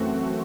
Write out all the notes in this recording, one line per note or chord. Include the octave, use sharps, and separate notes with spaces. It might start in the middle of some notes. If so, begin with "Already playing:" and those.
Already playing: F#2 E3 A3 C4 F#4